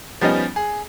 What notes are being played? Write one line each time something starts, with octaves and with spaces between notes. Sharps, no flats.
F3 G3 B3 C#4 D#4
G#4